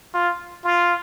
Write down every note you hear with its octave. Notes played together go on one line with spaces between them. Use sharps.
F4
F4